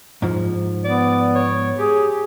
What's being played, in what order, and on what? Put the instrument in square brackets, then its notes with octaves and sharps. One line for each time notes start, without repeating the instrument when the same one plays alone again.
[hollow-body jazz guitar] G#2 F3
[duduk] B3 [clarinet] D5
[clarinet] C#5
[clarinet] G4 [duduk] G#4